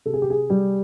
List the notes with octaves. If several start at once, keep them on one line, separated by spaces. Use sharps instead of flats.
C3 A4
G#4
G4
G#4
G3